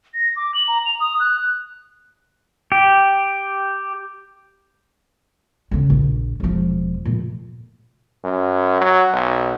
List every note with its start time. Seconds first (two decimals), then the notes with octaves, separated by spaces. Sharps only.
0.14 A#6
0.36 D6
0.54 F#7
0.68 A#5
0.86 F7
1.00 D#6
1.20 F#6
2.72 G4
5.71 D2 C#3
5.90 A#1
6.40 E1 F3
7.05 A#2 A3
8.24 F#2
8.81 F#3
9.13 B1